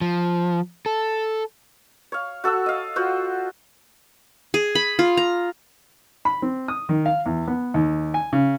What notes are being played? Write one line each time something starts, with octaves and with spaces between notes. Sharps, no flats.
F3
A4
C#5 F5
F#4 A4 F#5 E6
D#5 F5
F4 F#4 C5 F#5
G#4
B5
F4
A#5
B5
C4
D#6
D#3
F5
E2
B3
D#2
G#5
C#3